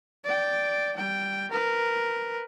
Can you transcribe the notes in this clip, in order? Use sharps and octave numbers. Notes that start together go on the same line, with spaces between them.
D5 G5
G3 G5
A#4 B4